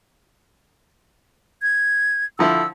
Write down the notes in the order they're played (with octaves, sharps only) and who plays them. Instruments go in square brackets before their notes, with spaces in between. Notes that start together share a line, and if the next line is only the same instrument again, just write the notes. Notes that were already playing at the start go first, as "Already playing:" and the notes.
[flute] G#6
[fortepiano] D3 F3 E4 [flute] E6